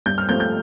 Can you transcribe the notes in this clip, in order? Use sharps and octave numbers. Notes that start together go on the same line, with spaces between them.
G2 G6
F6
F3 A3 C4 G6
G6